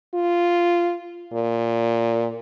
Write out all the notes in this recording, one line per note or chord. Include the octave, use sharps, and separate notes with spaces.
F4
A#2